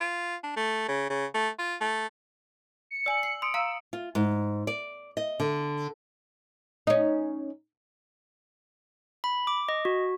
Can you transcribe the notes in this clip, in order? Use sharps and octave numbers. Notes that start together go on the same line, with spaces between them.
F4
D4
A3
C#3
C#3
A3
F4
A3
C#7
D5 G#5 E6 F#7
C7
C6 D#6 C#7 D7
F5 A#5 E6
F4
G#2
D5
D#5
D3
C#4 D#4
B5
D6
D#5
F#4